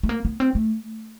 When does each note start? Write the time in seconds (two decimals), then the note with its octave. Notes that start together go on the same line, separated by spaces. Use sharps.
0.03 A3
0.09 A#3
0.25 B3
0.40 C4
0.55 A3